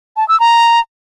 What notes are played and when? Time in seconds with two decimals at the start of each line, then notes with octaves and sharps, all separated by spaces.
0.17 A5
0.28 E6
0.40 A#5